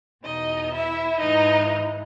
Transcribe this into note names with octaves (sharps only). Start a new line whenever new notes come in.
E2 B2 D#4 D#5
E4 E5
G#2 E3 D#4 D#5